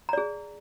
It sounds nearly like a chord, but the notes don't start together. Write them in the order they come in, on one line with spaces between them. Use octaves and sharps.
A#5 D5 G#4